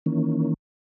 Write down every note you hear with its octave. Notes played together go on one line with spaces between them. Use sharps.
D#3 E3 A#3 C#4